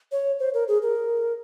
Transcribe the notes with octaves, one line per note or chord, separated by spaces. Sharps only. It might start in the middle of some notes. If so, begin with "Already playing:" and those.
C#5
C5
A#4
G#4
A#4